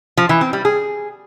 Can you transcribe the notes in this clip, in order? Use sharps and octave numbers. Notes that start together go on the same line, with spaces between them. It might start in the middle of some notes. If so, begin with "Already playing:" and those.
F3
E3
C4
G3
G#4